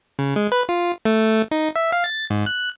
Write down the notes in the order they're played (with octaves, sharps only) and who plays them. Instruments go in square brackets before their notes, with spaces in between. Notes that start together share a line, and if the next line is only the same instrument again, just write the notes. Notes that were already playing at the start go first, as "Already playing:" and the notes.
[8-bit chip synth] C#3
G#3
B4
F4
A3
D#4
E5
F5
A6
G#2
F#6